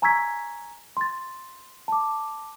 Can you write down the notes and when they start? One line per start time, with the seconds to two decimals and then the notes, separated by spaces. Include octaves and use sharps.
0.02 G#5 A#5 C#6 E6 G#6 B6
0.97 C6 A6
1.88 A5 D6